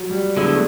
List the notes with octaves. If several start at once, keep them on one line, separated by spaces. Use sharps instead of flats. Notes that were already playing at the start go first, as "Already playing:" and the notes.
Already playing: F#3
G3
D3 F#3 G#3 B3 E4
A3